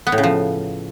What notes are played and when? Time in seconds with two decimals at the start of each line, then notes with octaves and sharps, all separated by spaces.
0.07 B3
0.12 A2
0.18 C#3
0.23 F3